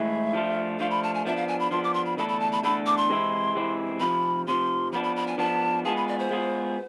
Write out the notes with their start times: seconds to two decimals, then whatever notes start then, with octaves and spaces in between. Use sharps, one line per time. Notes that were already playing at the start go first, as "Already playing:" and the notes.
Already playing: A2 E3 G#3 E5
0.33 F3 A3 D4 F4
0.80 F3 A3 D4 F4 F5
0.91 B5
1.03 A5
1.14 G#5
1.25 F3 B3 D4 E5
1.36 F5
1.48 G#5
1.59 B5
1.71 F3 B3 D4 C6
1.84 D6
1.94 C6
2.05 B5
2.17 E2 D3 A3 D4 A4 B5
2.29 B5
2.40 A5
2.52 B5
2.63 E2 D3 A3 D4 A4 B5
2.87 D6
2.97 C6
3.09 C3 E3 G#3 C4 E4
3.55 C3 E3 G#3 C4 E4
4.00 F2 C3 F3 B5
4.47 F2 C3 F3 C6
4.93 F3 B3 D4 B5
5.04 B5
5.16 B5
5.27 G#5
5.38 F3 B3 D4 A5
5.85 G#3 B3 F4 G#4 A5
5.96 B5
6.08 D5
6.19 C5
6.31 G#3 B3 F4 G#4